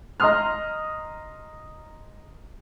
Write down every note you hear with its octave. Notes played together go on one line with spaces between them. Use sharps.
D#5 A#5 C6 D#6 F6